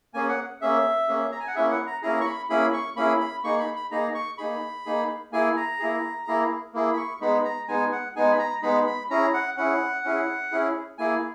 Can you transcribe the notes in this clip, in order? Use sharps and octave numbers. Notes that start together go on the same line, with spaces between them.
A#3 C#4 G#4 G#5
F#5
A#3 C#4 G#4 E5
A#3 C#4 G#4
A#5
G#5
F#5
A#3 C#4 E4 G#4 E5
F#5
A#5
A#3 C#4 E4 G#4 A#5
C#6
B5
A#3 C#4 E4 G#4 B5
C#6
A#3 C#4 E4 G#4 B5
B5
A#3 D#4 G#4 C#6
B5
B5
A#3 D#4 G#4 A#5
C#6
A#3 D#4 G#4 B5
A#3 D#4 G#4
A#3 E4 G#4 G#5
A#5
A#3 E4 G#4
A#3 E4 G#4
A#3 E4 G#4
B5
C#6
G#3 B3 D#4 G#4 B5
A#5
G#3 B3 D#4 G#4 G#5
F#5
G#3 B3 D#4 G#4 G#5
B5
A#5
G#3 B3 D#4 G#4 B5
B5
C#4 E4 G#4 A#5
F#5
C#4 E4 G#4 F#5
C#4 E4 G#4
C#4 E4 G#4
A#3 E4 G#4 G#5